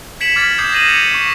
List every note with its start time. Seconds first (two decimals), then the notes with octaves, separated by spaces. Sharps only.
0.20 G#6 B6 C#7 D7 E7 F#7
0.36 D6 F6 G#6 A6
0.58 D6 D#6 G6 G#6 C7 E7
0.72 G#6 A#6 C7 D#7 E7 F#7
0.87 G#6 C#7 F7
1.14 C#6